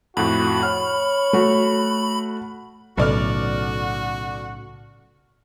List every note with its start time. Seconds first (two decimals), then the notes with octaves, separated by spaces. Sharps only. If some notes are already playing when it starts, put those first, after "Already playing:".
0.17 F2 A2 F#4 B5
0.63 C#5 F6
1.33 A3 F#4
2.97 B1 A2 C#3 F#4 A4 D5 F6